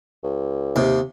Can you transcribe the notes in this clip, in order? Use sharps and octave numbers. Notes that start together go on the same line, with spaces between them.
C#2
D#2 C3